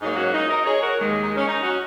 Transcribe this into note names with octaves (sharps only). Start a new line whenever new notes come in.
G#2 F#3 A#3 D#4
C#4 F#4
D#4
A#4 D#5
G#4 C#5
F#4 A#4
D#2 D#3 G#3
D#4
C#4
D#4
C#4 F#4